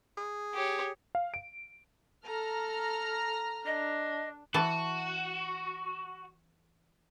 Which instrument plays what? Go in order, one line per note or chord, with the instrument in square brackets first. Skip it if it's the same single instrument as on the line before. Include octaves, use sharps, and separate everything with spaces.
[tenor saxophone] G#4
[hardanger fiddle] G4 C#5
[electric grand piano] F5
D7
[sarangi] A4 [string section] A#5 F6 A#6
[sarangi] D4 [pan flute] D#5
[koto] E3 A5 [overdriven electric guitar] F#4